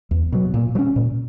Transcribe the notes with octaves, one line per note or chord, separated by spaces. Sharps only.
E2
B2 F#3
A#2
F#3
C#4
A#2